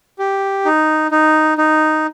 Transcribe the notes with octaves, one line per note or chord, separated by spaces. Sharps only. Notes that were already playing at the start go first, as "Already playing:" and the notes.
G4
D#4
D#4
D#4